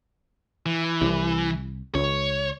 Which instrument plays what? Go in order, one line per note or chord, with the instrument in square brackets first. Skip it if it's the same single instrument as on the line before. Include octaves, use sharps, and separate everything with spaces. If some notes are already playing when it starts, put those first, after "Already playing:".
[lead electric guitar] E3
[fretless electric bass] C2
[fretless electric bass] C#2 [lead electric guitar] C#5